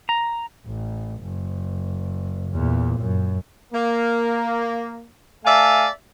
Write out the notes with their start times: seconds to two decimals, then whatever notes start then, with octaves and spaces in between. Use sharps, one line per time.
0.09 A#5
0.67 A1
1.22 F#1
2.51 E2 A#2
3.00 F#2
3.73 A#3
5.45 A3 D5 E5 F5 G#5 A5